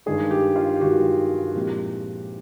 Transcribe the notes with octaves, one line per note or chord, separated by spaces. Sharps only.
G2 D#3 G#3 G#4
G4
F4
G4
G2 D#3 G#3 F#4
A#2 F3 G#3 C4 E4 G4